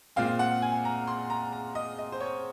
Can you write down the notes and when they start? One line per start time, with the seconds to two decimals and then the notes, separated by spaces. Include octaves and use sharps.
0.16 A#2 G#3 C4 F5
0.39 F#5
0.62 G#5
0.85 A#5
1.07 C6
1.30 A#5
1.52 A#5
1.75 D#5
1.98 D#5
2.12 C5
2.20 C#5